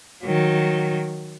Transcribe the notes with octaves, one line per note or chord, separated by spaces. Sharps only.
D#3 F#3